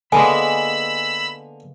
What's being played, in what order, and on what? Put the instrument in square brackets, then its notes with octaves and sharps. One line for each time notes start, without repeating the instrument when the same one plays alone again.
[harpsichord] D3 [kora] G#3 A#3 B3 [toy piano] G#5 [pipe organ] B5 E6